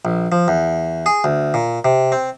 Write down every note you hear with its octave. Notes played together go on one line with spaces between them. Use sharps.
A#1
F3
E2
G#4
D2
A#2
C3
C4